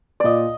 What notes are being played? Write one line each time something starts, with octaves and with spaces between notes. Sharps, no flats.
A#2 D5 D#5